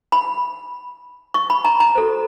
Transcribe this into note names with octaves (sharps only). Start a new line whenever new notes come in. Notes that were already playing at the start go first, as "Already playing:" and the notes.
B5
C#6
B5
A#5
A#5
F#4 A4 C5